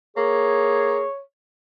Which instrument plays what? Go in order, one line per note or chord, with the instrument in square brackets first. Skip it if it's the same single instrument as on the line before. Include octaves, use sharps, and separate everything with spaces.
[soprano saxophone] A#3 [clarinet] G#4 [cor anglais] C#5